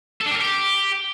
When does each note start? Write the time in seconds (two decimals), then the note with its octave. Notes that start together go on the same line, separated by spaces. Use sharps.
0.21 A4
0.26 D4
0.31 G4
0.36 A#4
0.41 G4